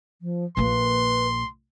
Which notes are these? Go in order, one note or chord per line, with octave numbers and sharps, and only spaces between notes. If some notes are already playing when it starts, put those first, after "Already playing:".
F3
A#1 A#3 B4 C6